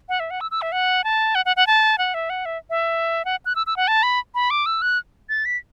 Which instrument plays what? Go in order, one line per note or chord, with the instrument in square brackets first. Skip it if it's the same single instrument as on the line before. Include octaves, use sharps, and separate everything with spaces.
[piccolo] F#5
E5
F#5
E6
E6
E5
F#5
A5
F#5
F#5
F#5
A5
F#5
E5
F#5
E5
E5
F#5
F#6
E6
E6
F#5
A5
B5
B5
D6
E6
F#6
A6
B6